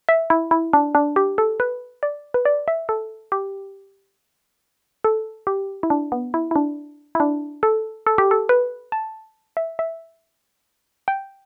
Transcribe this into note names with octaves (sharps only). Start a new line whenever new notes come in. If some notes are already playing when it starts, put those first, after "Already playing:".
E5
E4
E4
D4
D4
G4
A4
B4
D5
B4
D5
E5
A4
G4
A4
G4
E4
D4
B3
E4
E4
D4
E4
D4
A4
A4
G4
A4
B4
A5
E5
E5
G5